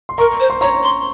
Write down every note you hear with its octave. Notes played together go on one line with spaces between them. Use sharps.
C6
A#4 A#5 C#6
C5
C6
C#5 A#5 C#6
C6